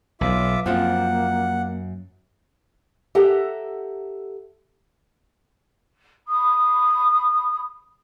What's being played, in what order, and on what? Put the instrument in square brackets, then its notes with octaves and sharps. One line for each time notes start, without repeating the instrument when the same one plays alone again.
[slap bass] B1 [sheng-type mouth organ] F4 E5 D6
[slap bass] F#2 [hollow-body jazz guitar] F3 C4 F4 [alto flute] A#3 [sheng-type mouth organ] F#5
[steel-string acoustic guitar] G4 A4 E5 F#5 A#5
[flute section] B5 D#6